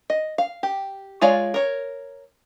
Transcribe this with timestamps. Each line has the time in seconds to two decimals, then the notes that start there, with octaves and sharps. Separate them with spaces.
0.10 D#5
0.38 F5
0.63 G4
1.21 G#3 F4 C#5 D5 F5
1.54 A#4 C#5